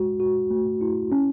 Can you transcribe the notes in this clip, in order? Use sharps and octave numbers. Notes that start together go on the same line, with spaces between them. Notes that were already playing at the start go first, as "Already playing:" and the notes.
Already playing: G#3 F#4
F#4
A3
E4
C#4